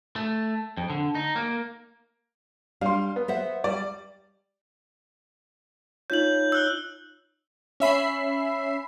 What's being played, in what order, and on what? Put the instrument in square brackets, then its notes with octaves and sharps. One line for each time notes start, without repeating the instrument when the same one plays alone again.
[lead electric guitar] A3
F2
D3
D#4
A#3
[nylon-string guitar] G3 D4 [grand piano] F5 C6
[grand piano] B3
[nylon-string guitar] C5 E5 F#5
[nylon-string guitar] G3 [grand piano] D5
[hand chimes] D#4 F4 C#5 [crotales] G6 F#7
[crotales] E6 F#6 G7
[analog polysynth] C#4 E5 B5 C7